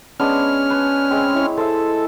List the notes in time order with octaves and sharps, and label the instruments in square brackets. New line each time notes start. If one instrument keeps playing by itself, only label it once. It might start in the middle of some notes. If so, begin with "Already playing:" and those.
[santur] G#3 B3 D4 [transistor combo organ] C#4 F6
[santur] B4
G#3 C4
E4 C#5
[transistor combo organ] A4 [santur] C5 E5